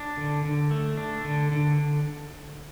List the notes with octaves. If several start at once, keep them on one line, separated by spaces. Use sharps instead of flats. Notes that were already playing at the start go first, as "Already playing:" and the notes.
Already playing: D4
D3
D3
A3
D4
D3
D3